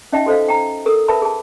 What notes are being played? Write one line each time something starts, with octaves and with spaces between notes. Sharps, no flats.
C#4 D#4 D#5 E5 G5 A5
F#4 A4 C5 D#5 F5
G5 A#5
A4 A#4 D#6
A#4 B4 E5 A5 B5
G#4 A5